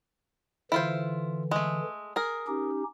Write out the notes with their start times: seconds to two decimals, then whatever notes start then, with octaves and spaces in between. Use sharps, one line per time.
0.72 D3 E3 E4 F4 C5
1.51 G#3 A3
2.16 G#4 A#4
2.47 C#4 D#4 G4